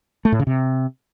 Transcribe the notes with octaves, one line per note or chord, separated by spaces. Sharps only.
A3
A2
C#3
C3